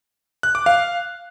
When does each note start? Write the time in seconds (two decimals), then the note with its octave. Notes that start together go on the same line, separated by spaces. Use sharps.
0.43 F#6
0.55 D6
0.66 F5